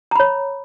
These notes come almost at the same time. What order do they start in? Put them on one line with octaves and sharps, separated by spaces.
A#5 B5 C#5